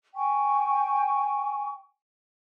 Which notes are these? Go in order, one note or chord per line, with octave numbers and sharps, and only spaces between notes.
G5 G#5 C#6